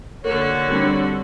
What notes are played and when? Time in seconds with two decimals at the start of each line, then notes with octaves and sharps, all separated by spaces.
0.24 D3 A#3 F#4 C#5
0.69 G3 C4 D4